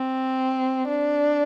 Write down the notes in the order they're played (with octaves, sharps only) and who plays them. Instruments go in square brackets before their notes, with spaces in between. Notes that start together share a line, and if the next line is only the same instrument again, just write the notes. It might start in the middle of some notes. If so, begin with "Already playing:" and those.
Already playing: [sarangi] C4
D4